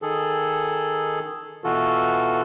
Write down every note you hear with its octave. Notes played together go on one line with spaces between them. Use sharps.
D#3 G#4 A4
B2 E3 F4 F#4 A4